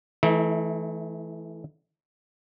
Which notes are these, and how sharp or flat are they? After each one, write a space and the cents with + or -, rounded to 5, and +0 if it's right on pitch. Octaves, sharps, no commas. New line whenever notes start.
E3 +0 A3 -20 D#4 +40